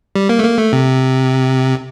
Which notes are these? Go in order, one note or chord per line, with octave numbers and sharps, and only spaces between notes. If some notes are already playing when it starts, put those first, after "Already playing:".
G3
A#3
A3
A#3
A3
C3